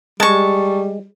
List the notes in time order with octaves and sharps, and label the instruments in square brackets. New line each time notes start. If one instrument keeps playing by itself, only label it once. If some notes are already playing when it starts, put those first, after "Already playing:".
[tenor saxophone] G3 [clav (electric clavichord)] G#3 [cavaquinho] A5 C#6